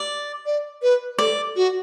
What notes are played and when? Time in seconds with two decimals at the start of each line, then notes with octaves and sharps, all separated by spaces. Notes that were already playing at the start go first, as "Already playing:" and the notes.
Already playing: D5
0.46 D5
0.82 B4
1.18 A4 D5
1.56 F#4